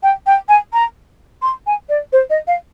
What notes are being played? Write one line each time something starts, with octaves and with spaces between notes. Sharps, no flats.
G5
G5
G#5
A#5
C6
G#5
D5
C5
D#5
F5